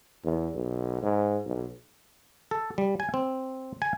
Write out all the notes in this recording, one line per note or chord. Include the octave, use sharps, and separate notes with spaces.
E2
B1
G#2
B1
A4
G3
G#5
C4
G#5